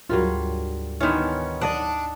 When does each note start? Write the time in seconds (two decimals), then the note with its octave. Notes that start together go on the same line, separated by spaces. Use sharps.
0.10 D2 G#2 F#3 G3 F4 A#4
1.01 D#3 E3 B3 C#4 C6 F6
1.61 D4 D5 D#5 F#5